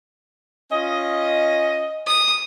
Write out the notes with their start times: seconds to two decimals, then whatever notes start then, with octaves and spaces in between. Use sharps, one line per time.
0.72 C#4 F4 D#5
2.07 D#6